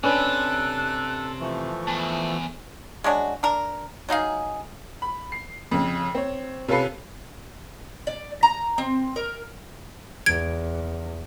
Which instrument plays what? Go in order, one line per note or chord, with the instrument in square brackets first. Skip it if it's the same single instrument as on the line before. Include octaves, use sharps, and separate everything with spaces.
[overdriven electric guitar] C3 [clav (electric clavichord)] C#4 D4 B4 [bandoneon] A4 [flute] F#6
[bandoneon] E3 F3 A3 [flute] C#6
[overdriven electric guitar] E2 [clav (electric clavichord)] A5
[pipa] G#3 C#4 D4 F#4
D4 A#4
F#3 D#4 G#4 F5
[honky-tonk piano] B5
C7
F2 C#3
C4 C#5
C3 C#4 F4 A4 B4 C7
[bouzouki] D5
A#5
C4
A#4
[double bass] E2 [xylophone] G#6 D7